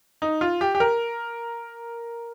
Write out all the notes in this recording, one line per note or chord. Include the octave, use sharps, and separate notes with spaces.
D#4
F4
G4
G4
A#4